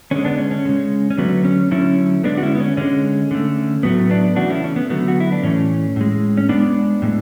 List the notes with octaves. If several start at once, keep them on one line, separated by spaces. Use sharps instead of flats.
D3 G#3 C#4
B3 D4
C#4
C#4
C#3 G#3
C#4
D3 F#3 A3 B3
C#4
D3 F#3 A3 C#4 E4
D3 G#3 B3 D4
F#4
C#4 E4
B3
C#4
D3 G#3 C#4
D3 A3
A2 F#3 A3 B3
B3 D4
C#3 E3 A3 D4 F#4
C#4 E4
C#4
B3
D3 F#3 A3 B3
F#4
E4
D4
A2 E3 A3 C#4
A2 G#3
C#4
A2 G#3 B3 D4
A2 G#3